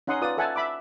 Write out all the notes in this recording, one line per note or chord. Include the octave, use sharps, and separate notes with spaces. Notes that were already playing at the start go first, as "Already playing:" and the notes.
C#4 D#4 F#5 C6 D#6
F4 B4 D5 D#6
A4 E5 F#5 G#5 A5
E5 B5 D6